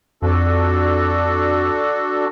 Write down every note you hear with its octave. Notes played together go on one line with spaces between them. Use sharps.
F2 D4 F#4 A4